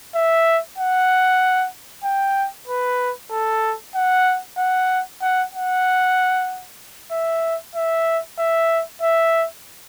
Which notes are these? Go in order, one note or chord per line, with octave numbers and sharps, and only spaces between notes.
E5
F#5
G5
B4
A4
F#5
F#5
F#5
F#5
E5
E5
E5
E5